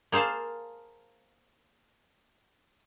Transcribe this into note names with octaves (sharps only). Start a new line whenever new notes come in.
A#3 G#4 C5 F5 A5